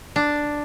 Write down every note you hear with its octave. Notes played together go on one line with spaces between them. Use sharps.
D4